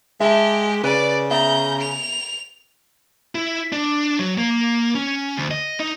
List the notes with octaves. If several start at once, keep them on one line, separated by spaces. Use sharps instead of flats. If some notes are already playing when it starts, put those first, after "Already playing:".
G#3 G4 E5 A5
C#3 B4 D5
B3 E5 A#5 G6
F7
E4
D4
F#3
A#3
C#4
D2
D#5
D#4